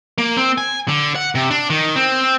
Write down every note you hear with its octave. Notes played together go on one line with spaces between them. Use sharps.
A#3
C4
G#5
D3
F#5
C3
D4
D#3
C4